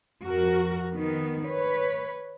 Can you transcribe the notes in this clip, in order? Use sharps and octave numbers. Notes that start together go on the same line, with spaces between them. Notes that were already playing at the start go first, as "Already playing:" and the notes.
F2 F#4 A#4
D#3 B3
B4 C#5